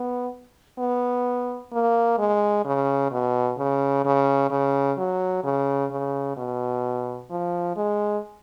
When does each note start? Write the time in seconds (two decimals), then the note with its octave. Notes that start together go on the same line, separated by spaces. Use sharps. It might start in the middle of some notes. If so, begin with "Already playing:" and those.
Already playing: B3
0.79 B3
1.72 A#3
2.19 G#3
2.65 C#3
3.11 B2
3.58 C#3
4.05 C#3
4.51 C#3
4.98 F#3
5.44 C#3
5.91 C#3
6.37 B2
7.30 F3
7.76 G#3